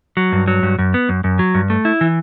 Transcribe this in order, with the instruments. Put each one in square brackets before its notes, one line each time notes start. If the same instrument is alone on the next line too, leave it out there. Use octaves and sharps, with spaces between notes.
[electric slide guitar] F#3
G2
F#3
G2
F#2
B3
F#2
F#2
F#3
G2
A3
E4
E3